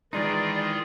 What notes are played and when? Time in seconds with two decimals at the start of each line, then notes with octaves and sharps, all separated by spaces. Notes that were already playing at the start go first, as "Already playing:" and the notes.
0.13 D#3 E3 G#3 D#4 F4 G#4 D5